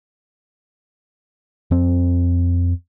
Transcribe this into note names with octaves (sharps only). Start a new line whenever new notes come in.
F2 C4